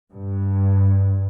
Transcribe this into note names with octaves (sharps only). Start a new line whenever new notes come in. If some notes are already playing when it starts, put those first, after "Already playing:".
G2